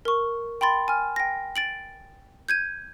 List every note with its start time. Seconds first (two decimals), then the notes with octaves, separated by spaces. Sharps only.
0.05 A#4 C#6
0.61 G5 B5 C6 A6
0.88 G#5 F6
1.16 G5 A#6
1.56 A6 D7 F#7
2.49 G6 G#6 D#7